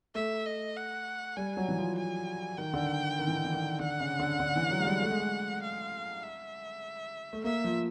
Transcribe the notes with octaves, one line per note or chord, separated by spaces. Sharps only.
A3 E5
D#5
F#5
G3 G#5
F#3
E3
F3
G#5
D#3 G5
D3
D#3
E3
D#3
E3
D#3
D3 F#5
C#3
D3
D3
E3
F#3
G#3
G3
A3
G#3
A3
F5
E5
A3
A#3 E5
F3